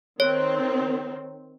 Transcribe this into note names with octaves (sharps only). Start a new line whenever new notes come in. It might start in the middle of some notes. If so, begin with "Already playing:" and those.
D#3 C4 C#5